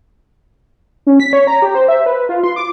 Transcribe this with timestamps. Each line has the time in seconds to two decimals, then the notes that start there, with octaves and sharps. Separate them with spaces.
1.07 C#4
1.20 B6
1.33 C#5
1.47 A#5
1.62 G4
1.75 C5
1.88 E5
2.06 B4
2.29 F4
2.44 C6
2.56 D6